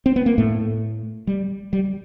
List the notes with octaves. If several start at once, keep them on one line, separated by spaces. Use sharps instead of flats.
C4
B3
A#3
A2 A3
G3
G3